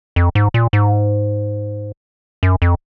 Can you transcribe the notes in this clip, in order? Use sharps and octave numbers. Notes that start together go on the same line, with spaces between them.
F2
G#2
A#2
G#2
F#2
F2